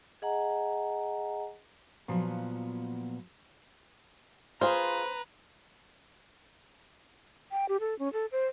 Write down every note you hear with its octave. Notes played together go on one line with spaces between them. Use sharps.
G#4 D#5 F#5 G#5 A#5
A#2 F3 F#3 B3
F4 G#4 B4 C5 A#5
G5
G4
A4
C#4
A4
C5